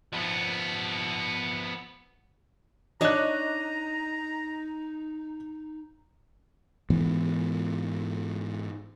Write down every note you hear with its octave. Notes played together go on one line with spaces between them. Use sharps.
F3 B3
D4 D#4 C#5 D#5 A5 A#5 F#6
G#2 E3 B3